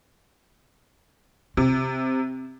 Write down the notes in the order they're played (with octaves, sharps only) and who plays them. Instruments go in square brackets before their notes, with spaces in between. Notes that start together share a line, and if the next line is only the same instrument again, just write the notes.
[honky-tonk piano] C3 [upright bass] C4